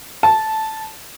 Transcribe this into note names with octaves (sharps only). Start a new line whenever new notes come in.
A5